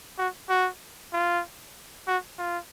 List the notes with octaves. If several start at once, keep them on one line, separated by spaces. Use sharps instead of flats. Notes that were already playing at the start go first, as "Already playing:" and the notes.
F#4
F#4
F4
F#4
F4